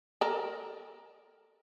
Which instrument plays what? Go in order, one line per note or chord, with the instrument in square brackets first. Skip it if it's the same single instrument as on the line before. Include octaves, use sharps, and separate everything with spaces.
[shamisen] A4 A#4